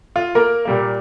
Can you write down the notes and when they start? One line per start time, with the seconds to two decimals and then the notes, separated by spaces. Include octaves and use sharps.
0.16 F4
0.35 A#3 A#4
0.65 A#2 G3 A#3